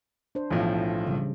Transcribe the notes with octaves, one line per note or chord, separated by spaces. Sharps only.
D4 C5
B1 A2 E3 F3
C#3 G3